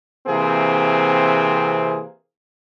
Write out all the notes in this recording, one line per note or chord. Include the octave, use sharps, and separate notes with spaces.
C3 E3 A#3 C4 G#4